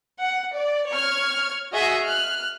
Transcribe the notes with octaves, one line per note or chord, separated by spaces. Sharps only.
F#5
D5
C#5 F6 G#6
F#4 G#4 D#5 E5
F6 F#6